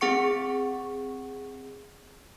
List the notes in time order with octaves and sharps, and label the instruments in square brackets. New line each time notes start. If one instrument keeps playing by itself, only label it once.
[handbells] C4 G#4 F#5 C#6 C#7